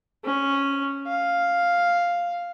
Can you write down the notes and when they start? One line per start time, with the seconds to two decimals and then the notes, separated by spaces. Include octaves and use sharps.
0.25 C#4
1.08 F5